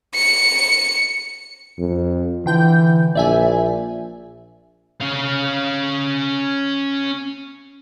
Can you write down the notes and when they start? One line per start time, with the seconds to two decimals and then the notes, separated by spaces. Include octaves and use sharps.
0.15 C#7
1.79 F2
2.46 D3 E3 G5 G6
3.15 A#1 D5 E5 G#5
5.01 C#4 F5